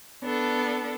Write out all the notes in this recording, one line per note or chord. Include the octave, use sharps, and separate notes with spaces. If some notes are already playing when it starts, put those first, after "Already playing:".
B3 D4 A4